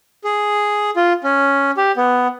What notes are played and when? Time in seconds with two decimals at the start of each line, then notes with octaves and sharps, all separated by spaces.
0.24 G#4
0.96 F4
1.24 C#4
1.77 G4
1.97 B3